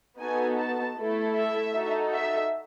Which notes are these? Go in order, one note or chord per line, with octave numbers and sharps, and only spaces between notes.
B3 D#4 F#4 A4 G#5
A5
A3 E4 A4
E5
D#4 F#4 A4
E5